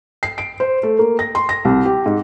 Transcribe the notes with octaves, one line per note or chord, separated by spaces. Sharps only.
C7
D7
C5
A3
A#3
A#6
C6
A#6
C2
G4
G#2